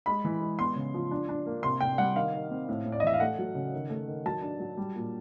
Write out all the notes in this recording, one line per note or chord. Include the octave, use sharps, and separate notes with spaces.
G#3 B5
E3
G#3
B3 C6
C#3
F3
D4
D4
A#3
C3 C6
C3 G5
G3 F#5
D#3 F5
D#3
C4
A2
A2
D5
D#5
E3 E5
F5
A3 F#5
F#3
C#3
D#3
A3
D#3
F#3 A5
D4
F#3
G3
A#2